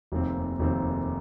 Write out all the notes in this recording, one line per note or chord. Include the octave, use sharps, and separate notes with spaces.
F1 D#2 D#3 C4
F1 D#2 D#3 C4